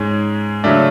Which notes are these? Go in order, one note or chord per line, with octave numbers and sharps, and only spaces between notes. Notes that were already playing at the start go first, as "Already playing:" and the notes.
Already playing: G#2 G#3 C#4
C#3 F#3 A3 D4 E5